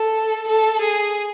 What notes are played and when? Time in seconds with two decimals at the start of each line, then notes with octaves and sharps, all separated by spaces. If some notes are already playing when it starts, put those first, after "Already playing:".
Already playing: A4
0.48 A4
0.81 G#4